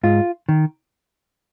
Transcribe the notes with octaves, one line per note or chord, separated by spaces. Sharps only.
G#2 F4
D#3